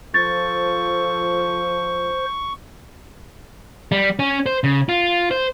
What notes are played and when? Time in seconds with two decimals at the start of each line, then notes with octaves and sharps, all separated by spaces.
0.14 F3 A4 C5 C#6 A6
3.92 G3
4.19 C#4
4.46 C5
4.64 C#3
4.89 F4
5.31 C5